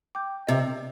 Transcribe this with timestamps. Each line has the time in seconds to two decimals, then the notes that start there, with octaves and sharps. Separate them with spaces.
0.15 G5 D6 G6
0.47 C3 D#5